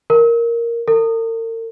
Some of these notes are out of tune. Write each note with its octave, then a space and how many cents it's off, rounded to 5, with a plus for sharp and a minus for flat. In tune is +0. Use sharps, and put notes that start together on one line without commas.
A#4 +0
A#4 -45